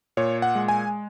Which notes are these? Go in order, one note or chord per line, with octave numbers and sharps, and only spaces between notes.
A#2 C#5
F#5
G#3
G#5